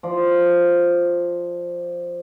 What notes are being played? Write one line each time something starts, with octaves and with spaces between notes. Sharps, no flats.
F3 D5